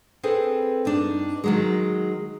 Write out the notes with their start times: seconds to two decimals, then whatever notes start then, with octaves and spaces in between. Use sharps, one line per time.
0.23 C4 G#4 A4 B4
0.85 G2 D4 D#4
1.44 D#3 F#3 G#3